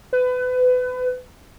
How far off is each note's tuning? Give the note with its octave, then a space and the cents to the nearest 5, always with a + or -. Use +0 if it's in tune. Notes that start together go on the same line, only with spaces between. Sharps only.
B4 +30